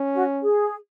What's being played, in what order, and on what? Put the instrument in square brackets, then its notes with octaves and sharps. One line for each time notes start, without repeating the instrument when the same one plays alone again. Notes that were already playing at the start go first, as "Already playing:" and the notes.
Already playing: [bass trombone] C#4
[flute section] F#4
G#4